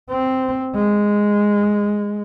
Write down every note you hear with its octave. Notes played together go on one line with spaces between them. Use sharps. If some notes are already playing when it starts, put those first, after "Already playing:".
C4
G#3